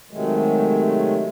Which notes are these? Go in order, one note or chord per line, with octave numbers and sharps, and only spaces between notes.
C3 D#3 F#3 G#3 A3